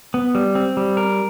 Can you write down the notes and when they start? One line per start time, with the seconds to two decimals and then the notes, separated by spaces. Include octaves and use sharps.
0.14 B3
0.35 G3
0.55 C4
0.77 G3
0.97 A#4